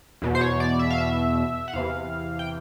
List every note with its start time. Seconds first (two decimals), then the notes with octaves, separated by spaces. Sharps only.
0.22 E2 B2
0.35 C5
0.41 C#5
0.60 D5
0.79 E5
0.90 F5
0.98 E5
1.68 F#5
1.73 E2 C3 E3 F5
2.39 G5